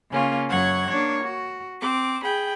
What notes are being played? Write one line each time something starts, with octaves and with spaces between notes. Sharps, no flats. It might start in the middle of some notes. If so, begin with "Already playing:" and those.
C#3 A#3 C#4 F4
F#2 F#3 C#5 F#5 G#6
A#3 D4 C#5
F#4
C4 D6
G#4 G5 B5